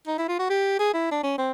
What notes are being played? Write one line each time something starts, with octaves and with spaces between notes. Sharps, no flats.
D#4
E4
F4
F#4
G4
G#4
E4
D4
C#4
C4